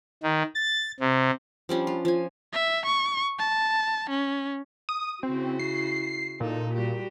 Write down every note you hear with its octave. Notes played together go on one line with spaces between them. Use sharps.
D#3
A6
C3
F3 G3 C#4 D4
F4
F3 G#5
E5
C#6
A5
C#4
D#6
C#3 C4 E4 F#4
C7
A#2 D#4 A4
G3 F#4 G4